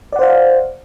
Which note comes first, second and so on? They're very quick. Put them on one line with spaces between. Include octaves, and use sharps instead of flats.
D5 F#5 C5 F5